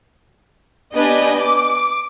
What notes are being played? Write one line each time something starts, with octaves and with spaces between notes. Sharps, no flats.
B3 D4 G4 B4 D#5 G#5
D6